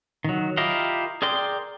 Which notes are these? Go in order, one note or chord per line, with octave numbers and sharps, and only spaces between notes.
D#3 F#3
E4 F4 G4 A#4 D#5
G#4 A#4 D5 G5 C6